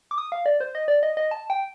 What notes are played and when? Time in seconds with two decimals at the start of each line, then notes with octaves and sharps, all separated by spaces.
0.11 D6
0.18 D#6
0.32 F5
0.46 D5
0.60 C5
0.75 D#5
0.88 D5
1.03 D#5
1.17 D#5
1.31 A5
1.50 G5